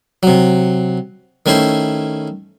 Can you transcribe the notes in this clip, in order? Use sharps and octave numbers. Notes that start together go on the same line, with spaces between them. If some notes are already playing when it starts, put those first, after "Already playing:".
C3 F#3
D#3 A3 C#4 E4 C5